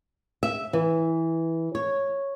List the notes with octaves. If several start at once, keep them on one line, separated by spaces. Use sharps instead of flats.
E5
E3
C#5